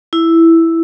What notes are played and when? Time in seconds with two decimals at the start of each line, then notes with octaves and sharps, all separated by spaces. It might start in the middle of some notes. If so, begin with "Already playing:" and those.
0.13 E4